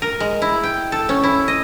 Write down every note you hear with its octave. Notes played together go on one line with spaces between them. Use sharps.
A#4
G#3
E4
G5
A4
C#4
E4
D#5